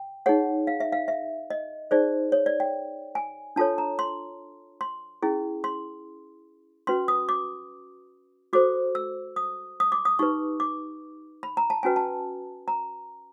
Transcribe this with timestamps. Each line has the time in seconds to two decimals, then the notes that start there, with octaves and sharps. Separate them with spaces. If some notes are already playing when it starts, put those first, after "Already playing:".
Already playing: G5
0.26 D#4 G#4 C#5 F#5
0.67 F5
0.80 E5
0.92 F5
1.08 E5
1.50 D#5
1.91 D#4 G#4 C5 D5
2.32 C#5
2.46 D5
2.60 G5
3.15 G#5
3.56 D4 F4 A4 C#5 A5
3.78 A#5
3.99 C6
4.81 C6
5.22 C#4 E4 G#4
5.64 C6
6.87 C#4 F#4 B4 C6
7.08 D#6
7.29 D6
8.53 F#4 A4 C5 D6
8.95 E6
9.36 D#6
9.80 D#6
9.92 D6
10.05 D#6
10.19 D#4 G4 B4 C#6
10.60 D6
11.43 B5
11.57 A#5
11.70 A5
11.83 C#4 F#4 B4 G#5
11.96 A5
12.68 A#5